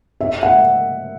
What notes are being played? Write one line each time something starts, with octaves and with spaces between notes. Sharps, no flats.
E5
F#5